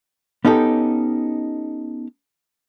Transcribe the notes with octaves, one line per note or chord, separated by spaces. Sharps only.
B3 C#4 D#4 G4 A4